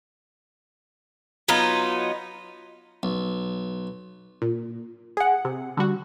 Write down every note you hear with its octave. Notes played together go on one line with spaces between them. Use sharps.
F#3 B3 D#4 F4
B1
A#2
G#4 F#5
C3
D3 G3 F#4